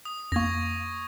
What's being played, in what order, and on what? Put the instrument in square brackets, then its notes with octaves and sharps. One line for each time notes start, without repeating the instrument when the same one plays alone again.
[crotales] D#6
[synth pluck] F2 A#3 [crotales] C#6 G#6 A#6